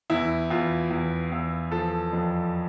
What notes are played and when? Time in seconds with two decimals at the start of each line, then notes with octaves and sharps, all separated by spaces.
0.10 E2 E4
0.50 E2 F4
0.91 E2
1.32 E2
1.71 F3 A4
2.13 F2